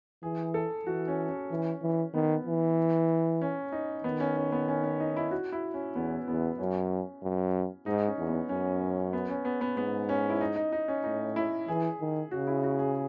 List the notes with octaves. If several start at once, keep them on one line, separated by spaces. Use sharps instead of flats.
E3 G#4
A4
E3 F#4
C#4
C#4
E3
E3
D#3 B3
E3
C#4
D#4
D#3 B3
C#4
C#4
B3
C#4
C#4
D#4
E4
F#4
E4
C#4
E2 B3
E2 B3
F#2 C#4
F#2
G#2 D#4
C#4
E2
B3
F#2 C#4
B3
C#4
B3
B3
G#2 B3
C#4
E4
D#4
D#4
D#4
C#4
A2 D#4
E4
E3 G#4
D#3
C#3 F#4
E4
F#4
G#4